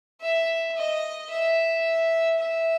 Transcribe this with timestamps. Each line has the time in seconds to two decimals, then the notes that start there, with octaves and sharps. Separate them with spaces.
0.22 E5
0.77 D#5
1.31 E5
2.39 E5